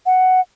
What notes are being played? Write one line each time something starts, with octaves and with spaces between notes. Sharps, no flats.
F#5